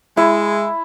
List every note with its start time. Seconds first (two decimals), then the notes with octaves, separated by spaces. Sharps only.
0.17 G#3 E4